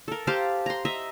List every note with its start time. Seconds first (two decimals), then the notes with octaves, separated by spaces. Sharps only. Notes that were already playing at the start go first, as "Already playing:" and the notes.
0.08 A4 A#4
0.27 G4 C5 F5 A5
0.66 A#5 C6
0.85 D#5 E5 A#5